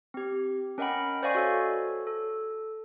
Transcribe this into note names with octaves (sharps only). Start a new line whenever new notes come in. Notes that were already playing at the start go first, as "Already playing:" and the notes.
C4 G4
C#4 A#4 D#5 F#5 G5 B5
C5 D5 D#5 F5 G#5 C#6
F#4 A4 C#5
A4